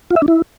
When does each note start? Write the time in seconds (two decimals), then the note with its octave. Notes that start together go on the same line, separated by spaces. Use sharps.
0.11 F4
0.16 E5
0.22 D4
0.28 E4